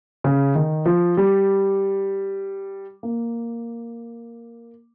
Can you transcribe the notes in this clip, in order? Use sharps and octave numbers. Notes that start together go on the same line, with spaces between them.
C#3
D#3
F3
G3
A#3